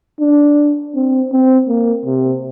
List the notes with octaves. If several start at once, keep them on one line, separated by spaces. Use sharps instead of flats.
D4
C4
C4
A#3
C3